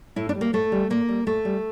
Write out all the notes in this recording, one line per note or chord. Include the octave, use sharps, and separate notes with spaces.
A2 E4
D4
G3
A#3
A2 A3
G3
A#2 A#3
G3
A#2 A3
G3